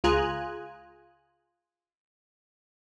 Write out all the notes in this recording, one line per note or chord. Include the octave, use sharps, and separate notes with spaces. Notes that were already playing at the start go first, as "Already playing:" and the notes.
C#2 F4 G#4 G#5 A#5 F#6